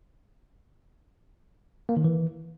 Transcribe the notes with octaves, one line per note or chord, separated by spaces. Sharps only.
A#3
D#3
E3